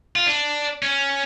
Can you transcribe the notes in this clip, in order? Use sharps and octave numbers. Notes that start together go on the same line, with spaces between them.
F4
D4
C#4